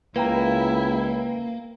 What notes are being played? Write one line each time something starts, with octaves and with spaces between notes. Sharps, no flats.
C#2 A#3 E4 B4 G5 A#5